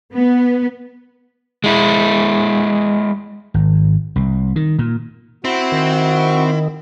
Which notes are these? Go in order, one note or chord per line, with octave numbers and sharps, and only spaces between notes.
B3
G#3 E4
G#1
C2
D#3
A#2
C4 E4 F#4 C5
D#3